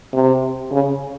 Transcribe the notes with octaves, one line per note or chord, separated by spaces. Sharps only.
C3
C#3